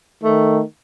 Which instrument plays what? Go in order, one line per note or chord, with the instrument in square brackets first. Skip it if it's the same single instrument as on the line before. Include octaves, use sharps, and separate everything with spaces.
[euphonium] D#3 [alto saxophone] A3